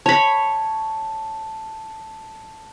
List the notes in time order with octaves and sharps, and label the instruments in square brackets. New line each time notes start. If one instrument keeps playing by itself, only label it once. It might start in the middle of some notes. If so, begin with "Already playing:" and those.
[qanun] C#5 B5 [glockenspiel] A5